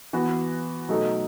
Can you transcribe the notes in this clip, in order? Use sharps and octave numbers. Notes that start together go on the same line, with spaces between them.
E3 B3 F#4
B2 F#3 A3 D#4 A4